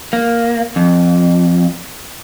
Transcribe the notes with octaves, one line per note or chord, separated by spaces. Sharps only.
A#3
F2